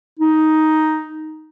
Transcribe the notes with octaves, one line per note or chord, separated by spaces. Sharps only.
D#4